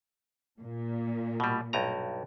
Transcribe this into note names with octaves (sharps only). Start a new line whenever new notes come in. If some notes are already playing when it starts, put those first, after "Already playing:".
A#2
B2 G3
B1 G2 A#5